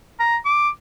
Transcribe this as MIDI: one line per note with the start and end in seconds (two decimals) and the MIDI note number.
0.20 0.37 82
0.45 0.69 86